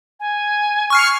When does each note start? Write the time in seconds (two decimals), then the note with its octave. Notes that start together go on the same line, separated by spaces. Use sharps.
0.20 G#5
0.90 C#6 F6 C7